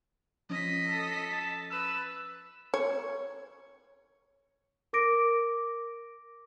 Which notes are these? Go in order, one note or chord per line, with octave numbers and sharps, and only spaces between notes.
F3 C#4 D#5 B6
A4
A5
B4 E6
C#5
A#4 D6 A#6 D7